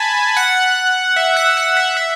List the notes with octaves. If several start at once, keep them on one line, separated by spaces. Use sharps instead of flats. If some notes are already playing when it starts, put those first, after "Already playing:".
Already playing: G#5 A5 B5
F#5
E5
F#5
F#5
E5
E5